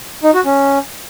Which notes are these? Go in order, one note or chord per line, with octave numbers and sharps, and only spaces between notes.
D#4
F#4
C#4